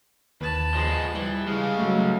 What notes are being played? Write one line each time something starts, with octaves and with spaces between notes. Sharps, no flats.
D#2 B4 A5
F3 G#3
E3 G3
C#3 G#3 F5
F#3 A3